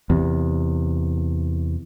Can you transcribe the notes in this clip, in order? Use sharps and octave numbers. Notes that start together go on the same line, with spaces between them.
E2 C3